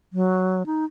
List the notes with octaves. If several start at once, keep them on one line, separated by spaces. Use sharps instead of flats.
F#3
D#4